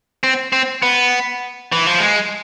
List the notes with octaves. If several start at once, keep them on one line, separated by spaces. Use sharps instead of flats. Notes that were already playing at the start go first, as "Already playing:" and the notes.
C4
C4
B3
E3
F3
G#3